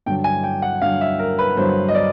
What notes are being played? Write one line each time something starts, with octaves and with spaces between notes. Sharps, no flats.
G2 D3 F#3 G5
G#5
G5
F#5
G2 D3 F#3 F5
E5
A#4
B4
G2 D3 F#3 C5
D#5
D5